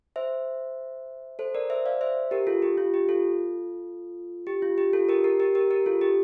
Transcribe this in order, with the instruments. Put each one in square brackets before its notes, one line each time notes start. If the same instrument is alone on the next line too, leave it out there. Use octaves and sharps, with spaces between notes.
[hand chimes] C5 E5
A4 C5
A#4 D5
C5 E5
D5 F5
C5 E5
G4 A#4
F4 A4
G4
F4
G4
F4 A4
G4
F4
G4
F4 A4
G4 A#4
G4 A#4
G4 A#4
G4 A#4
G4 A#4
F4 A4
G4